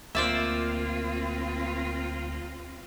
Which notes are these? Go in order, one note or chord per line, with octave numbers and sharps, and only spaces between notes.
D2 A#3 C4 F4 C5 D5 E5